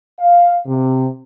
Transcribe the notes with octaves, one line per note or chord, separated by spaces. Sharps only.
F5
C3